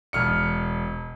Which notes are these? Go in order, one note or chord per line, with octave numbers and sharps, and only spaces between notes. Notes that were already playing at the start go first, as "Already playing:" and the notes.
E1 F6 C#7